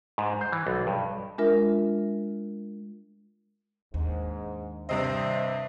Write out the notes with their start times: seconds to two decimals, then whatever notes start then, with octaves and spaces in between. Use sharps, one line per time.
0.18 G#2
0.41 C5
0.52 E3
0.67 B1
0.87 G2
1.38 G#3 D4 F4 A#4 E5
3.94 D#2 G#2 D4
4.89 G2 C3 C4 D#5 E5